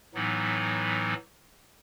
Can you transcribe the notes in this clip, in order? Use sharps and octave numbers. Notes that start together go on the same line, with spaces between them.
A2 E3 F#3 B3 D#4